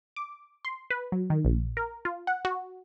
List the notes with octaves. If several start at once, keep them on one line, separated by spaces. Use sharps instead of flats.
D6
C6
B4
F#3
D#3
A#1
A#4
F4
F#5
F#4